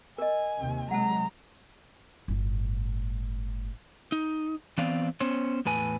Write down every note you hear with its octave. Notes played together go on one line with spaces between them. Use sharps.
A#4 D#5 G#5
D#2 C3
C3 F#3 G#3 F#5 A5 A#5
G1 A2
D#4
E3 B3 C4 D5 F5
B3 C#4 C5 C#5
E2 A2 B4 G#5